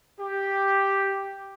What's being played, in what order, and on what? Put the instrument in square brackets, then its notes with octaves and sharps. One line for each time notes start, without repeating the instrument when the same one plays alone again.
[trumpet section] G4